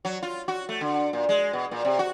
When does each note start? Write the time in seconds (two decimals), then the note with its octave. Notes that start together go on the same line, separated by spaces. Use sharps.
0.05 F#3
0.23 F4
0.48 F#4
0.69 A3
0.81 D3
1.13 A#2
1.29 G#3
1.53 B2
1.71 A#2
1.85 C3
1.99 F#4